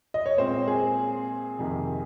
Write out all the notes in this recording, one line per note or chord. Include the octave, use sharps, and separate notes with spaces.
D#5
C#5
A#2 G#3 C4 C5
G#4
F2 C3 D#3